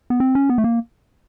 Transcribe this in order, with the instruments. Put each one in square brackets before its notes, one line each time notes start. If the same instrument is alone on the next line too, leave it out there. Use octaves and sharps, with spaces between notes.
[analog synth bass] B3
C4
C#4
B3
A3
A#3